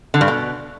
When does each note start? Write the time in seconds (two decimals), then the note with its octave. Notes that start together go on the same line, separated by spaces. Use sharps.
0.14 D3
0.21 G2
0.28 B2